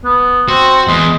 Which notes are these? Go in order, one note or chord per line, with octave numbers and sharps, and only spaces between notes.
B3
C4 F#4
E2 G#3